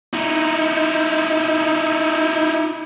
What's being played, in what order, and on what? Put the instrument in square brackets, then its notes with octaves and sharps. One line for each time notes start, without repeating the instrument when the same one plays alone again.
[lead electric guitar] D#4 E4